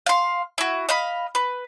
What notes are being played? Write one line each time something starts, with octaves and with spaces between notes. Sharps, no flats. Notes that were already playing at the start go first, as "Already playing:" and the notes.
F5 C6
E4 F#4
D#5 F5 B5
B4